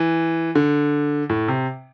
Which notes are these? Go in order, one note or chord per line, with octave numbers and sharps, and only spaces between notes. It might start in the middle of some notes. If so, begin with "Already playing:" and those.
Already playing: E3
D3
A2
C3